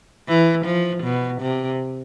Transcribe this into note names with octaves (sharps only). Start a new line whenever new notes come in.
E3
F3
B2
C3